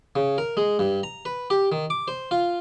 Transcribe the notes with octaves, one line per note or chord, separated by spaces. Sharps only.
C#3
A#4
G#3
G2
A#5
B4
G4
D#3
D6
C5
F4